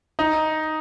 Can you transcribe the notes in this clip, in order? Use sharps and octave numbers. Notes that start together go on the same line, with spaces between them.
D#4